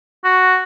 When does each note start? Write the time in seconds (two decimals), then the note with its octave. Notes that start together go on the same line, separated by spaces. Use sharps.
0.24 F#4